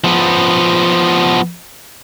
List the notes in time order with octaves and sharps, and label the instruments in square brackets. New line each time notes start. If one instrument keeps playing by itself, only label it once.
[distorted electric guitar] F3 B3